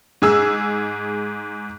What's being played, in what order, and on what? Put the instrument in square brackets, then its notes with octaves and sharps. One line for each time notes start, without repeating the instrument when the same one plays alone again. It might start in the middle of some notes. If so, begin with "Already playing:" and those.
[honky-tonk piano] G#2 G#4 E6